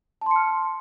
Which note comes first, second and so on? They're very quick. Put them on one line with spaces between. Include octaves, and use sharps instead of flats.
A5 C6 C#7 F6